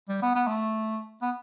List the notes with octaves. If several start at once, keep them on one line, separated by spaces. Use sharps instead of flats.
G3
B3
B3
A3
B3